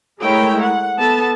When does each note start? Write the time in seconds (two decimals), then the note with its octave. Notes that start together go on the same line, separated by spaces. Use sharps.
0.22 G#3 A3 E4 A#4 C#5 G5
0.63 F#5
0.99 B3 A4 A5